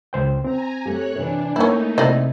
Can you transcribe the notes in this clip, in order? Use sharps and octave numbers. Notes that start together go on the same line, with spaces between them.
C#2 C5 G5
C4 G#5 A#5
A3 G4 C#5 F#6
C3 E3 D4
A3 A#3 C#4 D#4 E4
C3 C4 E4 D5 D#5